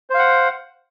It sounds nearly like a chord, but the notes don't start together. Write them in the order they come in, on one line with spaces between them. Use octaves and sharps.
C5 F5 F#5